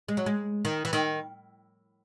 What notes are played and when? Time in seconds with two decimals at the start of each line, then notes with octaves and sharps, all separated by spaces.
0.09 G#3
0.17 F#3
0.26 G#3
0.65 D#3
0.85 E3
0.93 D#3